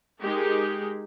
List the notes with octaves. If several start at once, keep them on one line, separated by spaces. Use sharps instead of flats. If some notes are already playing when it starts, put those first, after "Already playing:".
G#3 D#4 G4 G#4 A#4